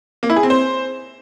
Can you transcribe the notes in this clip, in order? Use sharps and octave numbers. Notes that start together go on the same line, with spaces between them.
A#3
E4
G#4
C4
C5